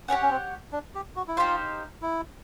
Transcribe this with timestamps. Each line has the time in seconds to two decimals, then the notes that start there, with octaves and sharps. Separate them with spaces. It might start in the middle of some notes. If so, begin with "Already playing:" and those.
0.08 C#4 G4 A#4 C#5 F#5
0.22 C#4
0.30 C4
0.72 D4
0.95 G4
1.16 F#4
1.28 E4
1.37 D#4 F4 G4 C5 F5
2.02 E4